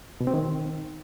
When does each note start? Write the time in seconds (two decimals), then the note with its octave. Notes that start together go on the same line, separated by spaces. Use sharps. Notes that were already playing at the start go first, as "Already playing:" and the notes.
0.21 B2
0.27 C4
0.34 D#3